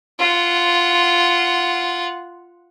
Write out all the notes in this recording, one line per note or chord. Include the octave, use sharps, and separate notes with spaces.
F4 F#5